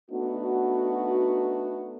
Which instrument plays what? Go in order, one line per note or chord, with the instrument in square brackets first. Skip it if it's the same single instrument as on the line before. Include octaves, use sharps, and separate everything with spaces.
[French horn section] A3 B3 D4 D#4 F#4